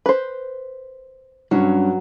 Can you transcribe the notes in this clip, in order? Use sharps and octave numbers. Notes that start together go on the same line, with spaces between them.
B4 C5
G2 F#3 C#4